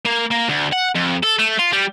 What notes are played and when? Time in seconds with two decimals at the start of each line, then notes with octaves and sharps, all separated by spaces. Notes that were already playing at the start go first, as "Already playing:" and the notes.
0.05 A#3
0.31 A#3
0.49 D2
0.73 F#5
0.95 F2
1.24 A4
1.39 A3
1.59 F4
1.73 G3